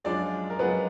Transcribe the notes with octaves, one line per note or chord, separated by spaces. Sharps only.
F#2 F3 G#3 D4 D5
A#4
F#2 F3 G#3 B3 B4